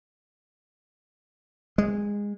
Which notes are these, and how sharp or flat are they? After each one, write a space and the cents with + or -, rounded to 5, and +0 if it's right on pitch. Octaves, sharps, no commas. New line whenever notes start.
G#3 -20